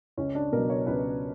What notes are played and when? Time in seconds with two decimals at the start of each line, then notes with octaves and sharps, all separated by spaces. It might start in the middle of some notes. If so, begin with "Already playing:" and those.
0.17 C#2 C#4
0.35 D4
0.52 B2 F#3 A#4
0.70 C#5
0.87 C#2 B4